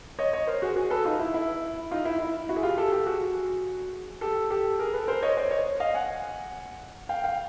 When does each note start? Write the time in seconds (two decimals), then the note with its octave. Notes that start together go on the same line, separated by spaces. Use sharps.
0.19 C#5 D#5
0.33 C#5 D#5
0.47 A#4 C5
0.62 F#4 G#4
0.76 F#4 G#4
0.91 A4 B4
1.05 D#4 F4
1.20 E4
1.34 E4
1.91 D#4 F4
2.05 E4
2.20 E4
2.49 E4 F#4
2.56 G#4
2.63 F4 G4
2.78 G4 A4
2.92 G4 A4
3.06 F#4 G#4
4.21 G4 A4
4.50 G4 A4
4.79 G#4 A#4
4.93 A4 B4
5.08 A#4 C5
5.22 C#5 D#5
5.37 C5 D5
5.51 C#5 D#5
5.80 D#5 F5
5.94 F#5 G#5
7.09 F5 G5
7.24 F5 G5